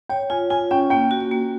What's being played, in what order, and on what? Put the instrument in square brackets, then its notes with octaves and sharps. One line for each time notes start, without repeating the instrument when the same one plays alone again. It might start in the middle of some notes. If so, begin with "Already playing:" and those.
[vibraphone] C#5 [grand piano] G5
[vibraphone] F4 [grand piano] G#5
[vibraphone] F4 [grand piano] G#5
[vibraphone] C#4 [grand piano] G5
[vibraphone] A#3 [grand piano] G5
[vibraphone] F#4
A#3